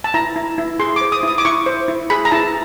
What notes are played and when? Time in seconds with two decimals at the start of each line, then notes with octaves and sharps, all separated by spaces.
0.04 A5
0.14 E4 A#5
0.36 E4
0.58 E4
0.80 G#4 C6
0.96 C5 D6
1.12 D#6
1.23 E4 D#6
1.38 D6
1.45 E4 C#6
1.66 C5
1.88 E4
2.10 G#4 B5
2.25 A#5
2.31 E4 A5